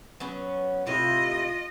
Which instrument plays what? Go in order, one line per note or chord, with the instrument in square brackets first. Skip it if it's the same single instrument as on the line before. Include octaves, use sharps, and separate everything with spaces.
[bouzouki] F#3 B3 C#4
[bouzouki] A2 C3 E4 [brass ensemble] F4 [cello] D#5